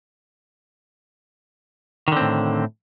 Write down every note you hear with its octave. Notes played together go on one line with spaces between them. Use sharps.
A2 D3 D#3 C4